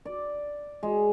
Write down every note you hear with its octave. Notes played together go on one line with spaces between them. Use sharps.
D5
G#3